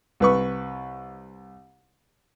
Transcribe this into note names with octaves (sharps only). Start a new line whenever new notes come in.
C2 B4 C#6